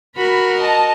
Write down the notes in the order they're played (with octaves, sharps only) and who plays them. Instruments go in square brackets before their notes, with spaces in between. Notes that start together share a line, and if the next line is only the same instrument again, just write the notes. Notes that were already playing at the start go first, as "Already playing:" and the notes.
[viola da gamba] F#4 A#4 [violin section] B5
[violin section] D#5 A5